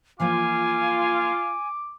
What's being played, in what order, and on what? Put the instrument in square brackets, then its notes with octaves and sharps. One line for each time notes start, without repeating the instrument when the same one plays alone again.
[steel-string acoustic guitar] E3 F3 A#3 [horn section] F4 [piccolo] G#5 [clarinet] D6